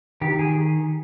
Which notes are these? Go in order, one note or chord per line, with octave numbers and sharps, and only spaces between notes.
D#3 G4
G#4